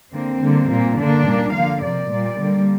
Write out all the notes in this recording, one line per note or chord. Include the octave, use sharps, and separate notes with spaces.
D3 A#3 C4
D3 G3 A#3
A#2 A#3
D3 A#3 D4
A#2 G3 A#3
D3 F3 A#3 F5
C3 F3 A#3 D5
A#2 G3 A#3
D3 G3 A#3